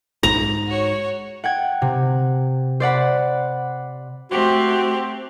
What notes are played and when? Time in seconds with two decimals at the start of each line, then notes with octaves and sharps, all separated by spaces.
0.23 G#2 A#5 F7
0.67 F#4 C#5
1.44 F#5 G5 G#6
1.82 C3
2.80 C5 D5 F#5 B5
4.31 A3 C4 F#4 G4